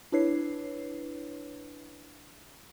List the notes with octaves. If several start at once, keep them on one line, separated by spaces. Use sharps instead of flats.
D4 E4 B4 C#5 C7